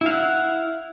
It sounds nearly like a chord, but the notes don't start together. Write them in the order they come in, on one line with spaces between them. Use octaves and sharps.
E4 F5 F#5